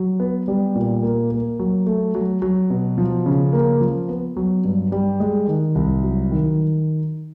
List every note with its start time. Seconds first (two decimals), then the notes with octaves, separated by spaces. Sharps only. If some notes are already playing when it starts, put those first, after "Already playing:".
Already playing: F#3
0.20 B3
0.48 G3
0.75 A#2
1.03 A#3
1.31 A#3
1.59 F#3
1.86 A3
2.15 F#3
2.42 F#3
2.70 B2
2.98 F3
3.26 C#3
3.53 A#3
3.81 F3
4.09 B3
4.37 F#3
4.64 G2
4.92 G3
5.20 G#3
5.47 D#3
5.75 C2
6.03 F#3
6.31 D#3